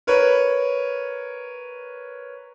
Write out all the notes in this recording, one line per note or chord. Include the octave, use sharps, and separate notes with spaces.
A#4 B4 C#5